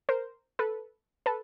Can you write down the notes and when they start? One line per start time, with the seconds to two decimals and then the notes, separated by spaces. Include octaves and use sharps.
0.09 A#4 C5
0.59 A4 B4
1.26 A4 B4